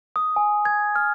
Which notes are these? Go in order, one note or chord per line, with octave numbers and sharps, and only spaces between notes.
D#6
G#5
G#6
F6